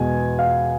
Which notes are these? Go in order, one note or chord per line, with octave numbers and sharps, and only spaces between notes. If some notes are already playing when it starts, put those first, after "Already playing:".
Already playing: E2 B2 G#3 G#5
F5